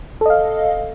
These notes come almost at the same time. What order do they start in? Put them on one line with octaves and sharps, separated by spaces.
A4 D#5 F5